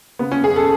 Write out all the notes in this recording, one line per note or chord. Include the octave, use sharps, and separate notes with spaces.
C#3 B3
C#4
F#2 G#4
A4